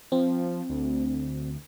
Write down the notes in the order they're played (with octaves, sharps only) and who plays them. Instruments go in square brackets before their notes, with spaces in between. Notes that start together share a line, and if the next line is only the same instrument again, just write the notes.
[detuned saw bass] F3 [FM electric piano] C4
[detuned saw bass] D2